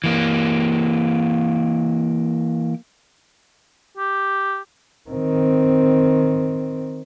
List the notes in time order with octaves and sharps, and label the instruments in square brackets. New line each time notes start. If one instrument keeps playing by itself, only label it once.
[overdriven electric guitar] E3 A#3
[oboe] G4
[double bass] D#3 C4